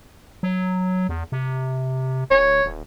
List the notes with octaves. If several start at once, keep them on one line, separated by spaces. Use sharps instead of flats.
F#3
E2
C3
D1 C#5
D#1